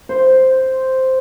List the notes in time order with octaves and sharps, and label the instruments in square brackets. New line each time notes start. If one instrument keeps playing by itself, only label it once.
[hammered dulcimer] C5